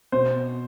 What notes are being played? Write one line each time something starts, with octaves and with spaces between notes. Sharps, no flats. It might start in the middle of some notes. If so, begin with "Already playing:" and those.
B2 C5